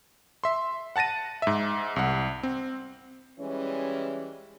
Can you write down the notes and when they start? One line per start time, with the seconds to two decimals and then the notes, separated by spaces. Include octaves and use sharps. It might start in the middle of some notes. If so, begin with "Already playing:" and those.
0.44 E5 C6
0.96 F#5 A5 A6 A#6 D#7
1.42 G#2 E5
1.96 C2 F#5
2.43 C4
3.40 E3 G3 G#3 C#4